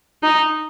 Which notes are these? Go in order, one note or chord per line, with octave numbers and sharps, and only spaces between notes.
D#4